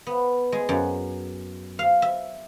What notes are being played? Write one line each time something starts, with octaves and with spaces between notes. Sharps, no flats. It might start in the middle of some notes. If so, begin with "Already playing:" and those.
B3
G#3
F#2
F5
E5